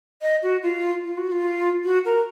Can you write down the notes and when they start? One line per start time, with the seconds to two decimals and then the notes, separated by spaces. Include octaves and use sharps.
0.22 D#5
0.42 F#4
0.62 F4
1.03 F4
1.17 F#4
1.31 F4
1.84 F#4
2.05 A#4